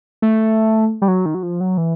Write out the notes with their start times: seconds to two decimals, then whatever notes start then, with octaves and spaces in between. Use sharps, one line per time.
0.22 A3
1.02 G3
1.08 F#3
1.26 D#3
1.34 F#3
1.43 F3
1.60 F#3
1.77 E3